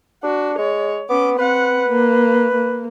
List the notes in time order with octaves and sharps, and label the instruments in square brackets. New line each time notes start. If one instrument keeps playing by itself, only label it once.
[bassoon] D4 [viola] F#4
[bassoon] G#3 [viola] C#5
[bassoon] B3 [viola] C#4 D6
[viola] C4 F#5 [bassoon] B4
[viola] A#3
A#3